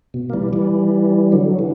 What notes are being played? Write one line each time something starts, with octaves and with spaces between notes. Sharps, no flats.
B2
A#3
E3 G3
E3 G3
D3 F#3
E3